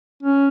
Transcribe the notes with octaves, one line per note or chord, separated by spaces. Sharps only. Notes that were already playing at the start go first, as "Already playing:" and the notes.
C#4